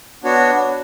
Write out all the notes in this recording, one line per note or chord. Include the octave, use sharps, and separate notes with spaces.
B3 D4 F#4 C#5